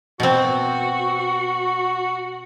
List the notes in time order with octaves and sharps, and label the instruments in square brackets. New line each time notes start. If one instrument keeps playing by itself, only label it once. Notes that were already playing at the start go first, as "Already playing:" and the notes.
[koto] B2 C4 [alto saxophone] F#4